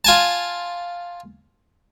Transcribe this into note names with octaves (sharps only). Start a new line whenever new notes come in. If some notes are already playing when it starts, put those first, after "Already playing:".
F4 G#5 A5